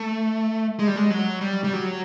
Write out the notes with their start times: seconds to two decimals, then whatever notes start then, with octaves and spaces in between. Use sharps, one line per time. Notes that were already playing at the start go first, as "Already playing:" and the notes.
Already playing: A3
0.79 G#3
0.87 G3
0.96 G#3
1.10 F#3
1.41 G3
1.64 G3
1.73 F#3